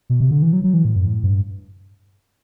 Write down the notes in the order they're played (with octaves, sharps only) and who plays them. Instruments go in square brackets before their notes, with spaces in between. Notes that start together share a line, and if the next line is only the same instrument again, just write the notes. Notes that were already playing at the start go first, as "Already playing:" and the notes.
[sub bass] B2
C3
D3
E3
F#3
F#3
E3
A2
F#2
A2
G2